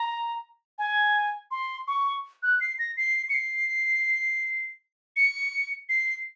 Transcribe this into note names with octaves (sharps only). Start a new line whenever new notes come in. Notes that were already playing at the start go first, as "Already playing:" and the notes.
Already playing: A#5
G#5
C6
C#6
F#6
C7
A#6
C7
C#7
C7
C#7
C7